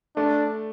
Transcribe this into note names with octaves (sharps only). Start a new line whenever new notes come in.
A3 D4